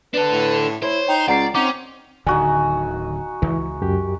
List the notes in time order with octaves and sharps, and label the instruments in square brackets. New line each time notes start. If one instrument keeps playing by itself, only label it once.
[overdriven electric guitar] D4 A4 [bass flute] B4
[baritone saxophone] A2
[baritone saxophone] E4 [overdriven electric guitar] C5 [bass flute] C#5
[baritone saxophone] D#4 [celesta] G5
[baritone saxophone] C#2 [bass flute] C#4 [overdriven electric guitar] D5 [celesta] F#5 A#5 C7
[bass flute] C4 [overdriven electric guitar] C#4 [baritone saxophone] D#4 [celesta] F#5 D6
[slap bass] D1 D3 D#3 [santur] D#4 F#4 G#5
[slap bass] C#2 [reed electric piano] E3
[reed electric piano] F#2 G4